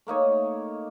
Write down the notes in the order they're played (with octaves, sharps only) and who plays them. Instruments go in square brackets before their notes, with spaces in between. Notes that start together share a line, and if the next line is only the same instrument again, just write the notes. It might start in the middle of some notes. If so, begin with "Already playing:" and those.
[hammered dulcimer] A3 A#3 D#4 C#5